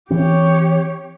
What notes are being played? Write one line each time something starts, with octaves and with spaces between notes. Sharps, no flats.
E3 C4 G4 C#5